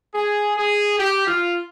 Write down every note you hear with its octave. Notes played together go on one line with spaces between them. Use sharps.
G#4
G#4
G4
F4